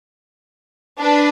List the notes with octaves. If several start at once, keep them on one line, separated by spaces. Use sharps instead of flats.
D4 B4